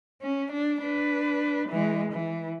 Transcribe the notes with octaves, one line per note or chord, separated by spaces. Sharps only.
C#4
D4
D4 B4
E3 G#3
E3